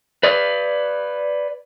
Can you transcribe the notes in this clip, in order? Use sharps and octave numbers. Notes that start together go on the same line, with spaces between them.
B4 D5